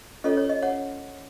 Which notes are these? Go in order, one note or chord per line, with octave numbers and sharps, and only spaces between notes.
C#4 F4 A4 C#5 D#5
C#5
D#5
C#5 F#5